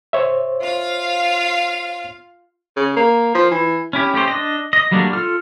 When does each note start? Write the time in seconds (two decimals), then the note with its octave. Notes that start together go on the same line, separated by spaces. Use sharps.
0.13 C5 C#5 E5
0.61 F4 F5
2.77 C#3
2.96 A#3
3.35 F3
3.51 E3
3.93 C#4 E4 G4
4.14 A3 C#4 G4 C5
4.28 D4 D#5
4.73 D#5
4.91 F#3 G3 A3 A#3 D4
5.13 F4 A4 F6